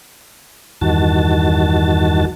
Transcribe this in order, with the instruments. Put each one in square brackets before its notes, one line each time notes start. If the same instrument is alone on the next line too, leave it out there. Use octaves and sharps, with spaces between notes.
[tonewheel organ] E2 G2 D#3 F#4 A5